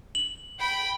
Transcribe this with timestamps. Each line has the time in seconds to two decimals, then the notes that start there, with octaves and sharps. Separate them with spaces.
0.15 F#7
0.59 G5 B5